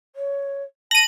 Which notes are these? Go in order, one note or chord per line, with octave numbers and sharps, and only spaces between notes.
C#5
A5 A#6 D#7 F#7